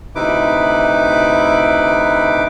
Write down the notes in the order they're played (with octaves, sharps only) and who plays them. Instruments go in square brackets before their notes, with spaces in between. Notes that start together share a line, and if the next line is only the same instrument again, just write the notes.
[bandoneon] D2 C3 D#4 E4 B4 D6